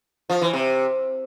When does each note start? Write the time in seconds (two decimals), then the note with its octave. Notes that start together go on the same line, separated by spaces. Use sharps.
0.30 F3
0.41 E3
0.53 C3